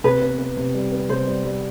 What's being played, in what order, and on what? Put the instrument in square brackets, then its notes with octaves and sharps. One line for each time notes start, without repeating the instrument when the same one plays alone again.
[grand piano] C3 [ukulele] B4
[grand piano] B3
B3
C3
G3
B3
[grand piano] C3 [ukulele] C5
[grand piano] G3
G3